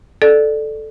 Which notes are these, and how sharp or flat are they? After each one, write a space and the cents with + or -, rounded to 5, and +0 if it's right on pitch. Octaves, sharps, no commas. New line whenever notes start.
A4 -5 D5 +15